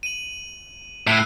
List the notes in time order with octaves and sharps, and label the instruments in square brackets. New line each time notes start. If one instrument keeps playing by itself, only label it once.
[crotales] D#7 F#7
[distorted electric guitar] A2 [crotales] E6 F#6 C#7